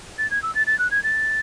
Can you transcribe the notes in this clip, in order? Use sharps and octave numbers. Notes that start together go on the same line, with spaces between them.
A6
G#6
E6
A6
A6
F#6
G#6
A6